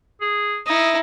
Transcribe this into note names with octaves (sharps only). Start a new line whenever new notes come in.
G#4
D#4 E4 D#6